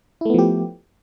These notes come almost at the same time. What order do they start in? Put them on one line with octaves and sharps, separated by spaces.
E4 A3 B3 F3 G4